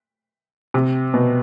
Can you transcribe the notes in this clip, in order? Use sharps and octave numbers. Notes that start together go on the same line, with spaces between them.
C3
B2